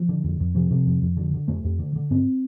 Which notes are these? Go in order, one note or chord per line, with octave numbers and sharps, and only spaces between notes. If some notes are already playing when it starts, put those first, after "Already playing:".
Already playing: F3
D3
F2
F2
C3 F3
C3
F2
F2
D3
D3
F2 A3
F2
D3
D3
G2 C4